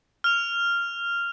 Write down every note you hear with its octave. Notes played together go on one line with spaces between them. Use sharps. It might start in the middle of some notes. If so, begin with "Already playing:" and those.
F6 F7